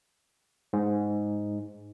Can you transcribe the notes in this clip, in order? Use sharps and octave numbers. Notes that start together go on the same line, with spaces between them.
G#2